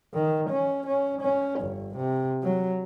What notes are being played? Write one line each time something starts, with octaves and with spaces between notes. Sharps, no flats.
D#3
C#4
C#4
C#4
G1
C3
F#3